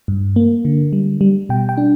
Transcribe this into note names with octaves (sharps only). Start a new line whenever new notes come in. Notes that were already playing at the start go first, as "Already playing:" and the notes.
G2
A#3
D3
G3
G3
B2 G5
G5
D4